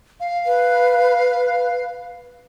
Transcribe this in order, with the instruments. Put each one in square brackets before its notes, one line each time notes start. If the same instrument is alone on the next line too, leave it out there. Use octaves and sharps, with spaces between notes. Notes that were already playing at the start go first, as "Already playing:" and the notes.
[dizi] F5
[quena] B4